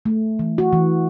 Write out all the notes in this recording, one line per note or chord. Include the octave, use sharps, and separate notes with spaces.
A3
E3
F#4
E3